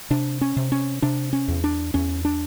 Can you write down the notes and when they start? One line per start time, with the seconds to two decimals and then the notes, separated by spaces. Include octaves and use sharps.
0.10 C3 D4
0.41 C#4
0.56 C3
0.72 C#4
1.02 C3 D4
1.33 C#4
1.48 E2
1.64 D4
1.94 E2 C#4
2.25 D4